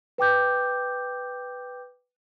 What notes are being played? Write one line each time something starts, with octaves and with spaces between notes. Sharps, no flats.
B4 G5 D6 G6